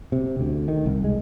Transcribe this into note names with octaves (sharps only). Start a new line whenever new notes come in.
C3
D2
D#3
C2
G#3